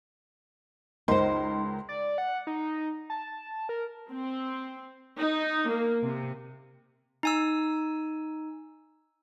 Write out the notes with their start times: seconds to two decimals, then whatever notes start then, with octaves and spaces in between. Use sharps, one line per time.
1.08 C#2 D#4 A#4 C5 C6
1.89 D5
2.18 F#5
2.47 D#4
3.10 A5
3.69 A#4
4.12 C4
5.17 D#4
5.69 A#3
6.03 C3
7.23 D#4 G#5 E6